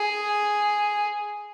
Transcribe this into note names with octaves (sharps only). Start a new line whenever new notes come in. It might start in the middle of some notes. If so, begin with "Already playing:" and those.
Already playing: G#4